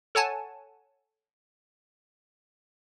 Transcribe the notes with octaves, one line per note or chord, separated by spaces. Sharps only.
A4 C#5 F#5 G#5 A5